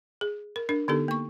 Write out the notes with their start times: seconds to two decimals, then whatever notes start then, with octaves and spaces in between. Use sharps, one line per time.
0.21 G#4
0.56 A#4
0.69 D4 A#4
0.88 D3 B3 D#4 G4 A4
1.08 A#3 C#6